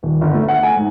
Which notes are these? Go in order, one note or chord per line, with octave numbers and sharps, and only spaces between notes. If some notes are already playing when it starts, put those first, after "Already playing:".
D#1
G1
A3
F#5
G#5
G#2